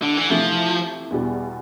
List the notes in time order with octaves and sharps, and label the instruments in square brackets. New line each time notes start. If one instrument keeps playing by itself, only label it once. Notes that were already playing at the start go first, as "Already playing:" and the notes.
[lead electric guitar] D3
E3
[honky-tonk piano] C3 E3 A3 E4 [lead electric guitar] F3
[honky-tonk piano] E2 B2 G3